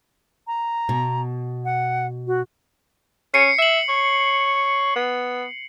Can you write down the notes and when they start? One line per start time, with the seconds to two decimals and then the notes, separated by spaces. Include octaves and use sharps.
0.47 A#5
0.89 B2
1.65 F#5
2.27 F#4
3.34 C#4 C7 C#7
3.59 E5 C7 F#7
3.89 C#5
4.96 B3